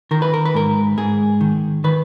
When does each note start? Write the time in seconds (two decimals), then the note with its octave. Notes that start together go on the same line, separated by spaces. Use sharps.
0.11 D#3 A#4
0.22 B4
0.34 A#4
0.46 B4
0.54 G#2 A#4
0.98 G#2 G#4
1.41 D#3
1.84 D#3 B4